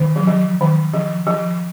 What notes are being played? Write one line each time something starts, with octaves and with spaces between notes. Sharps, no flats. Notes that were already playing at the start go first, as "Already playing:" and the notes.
Already playing: D#3
F#3
F3
D#3
F3
F3